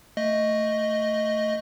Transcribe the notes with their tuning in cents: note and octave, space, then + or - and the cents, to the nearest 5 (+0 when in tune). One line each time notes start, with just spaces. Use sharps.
A3 +15 D#5 +0